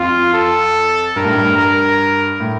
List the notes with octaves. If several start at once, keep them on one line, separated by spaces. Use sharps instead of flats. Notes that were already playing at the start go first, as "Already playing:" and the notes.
Already playing: F2 F4
A4
G2 A#4
A2
G2
A#4
A2